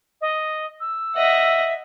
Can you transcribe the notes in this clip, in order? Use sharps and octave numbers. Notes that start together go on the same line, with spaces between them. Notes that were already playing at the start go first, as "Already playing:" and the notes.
D#5
E6
D#5 E5 F#5